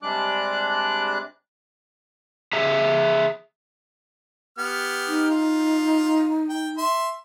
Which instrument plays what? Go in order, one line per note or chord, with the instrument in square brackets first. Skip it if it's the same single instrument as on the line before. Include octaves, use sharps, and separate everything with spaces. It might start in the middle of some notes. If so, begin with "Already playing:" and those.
[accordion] C3 G3 G#3 D4 D6 F#6
[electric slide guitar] G#4 E5 A#5
[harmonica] B3 G4 F6
[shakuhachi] D#4
[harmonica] F4
G5
E5 C6